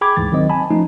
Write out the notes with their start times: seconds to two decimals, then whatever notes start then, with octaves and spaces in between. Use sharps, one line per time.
0.01 G#4 G5 B5 D6 G#6
0.16 D2 G#2 E3 A6
0.32 D#3 F#3 C4 D#5
0.50 G#5 A5 B5
0.70 F3 A3 C#4 D#4